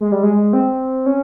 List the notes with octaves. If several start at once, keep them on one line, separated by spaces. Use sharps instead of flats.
G#3
G3
G#3
C4
C#4